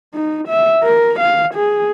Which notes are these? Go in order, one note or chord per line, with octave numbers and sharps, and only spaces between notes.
D#4
E5
A#4
F5
G#4